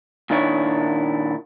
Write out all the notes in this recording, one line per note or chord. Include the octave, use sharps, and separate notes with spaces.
A#2 D#3 D4 E4 C#5